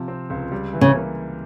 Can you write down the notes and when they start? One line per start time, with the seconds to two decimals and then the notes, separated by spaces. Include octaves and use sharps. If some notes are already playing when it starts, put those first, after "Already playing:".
Already playing: C3 F3
0.08 C4
0.30 C#2
0.52 G3
0.73 E3
0.81 C#3
0.95 A#3